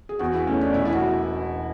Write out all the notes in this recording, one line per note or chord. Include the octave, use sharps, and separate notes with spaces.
G#4
E2 F#4
E4
B2 A3 C#4
D4
E1 E4
E4
F#4